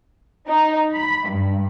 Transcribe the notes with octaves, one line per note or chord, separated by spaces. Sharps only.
D#4
B5
G2